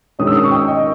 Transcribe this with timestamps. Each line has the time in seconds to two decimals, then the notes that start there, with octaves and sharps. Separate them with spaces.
0.19 D#3 G#3 C#4 D#6
0.27 E6
0.36 D#6
0.44 C#6
0.51 G5
0.68 D#5